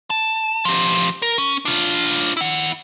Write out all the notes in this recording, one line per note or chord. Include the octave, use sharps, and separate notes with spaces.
A5
F3 G4
A#4
C#4
D4 F4
E4 F#5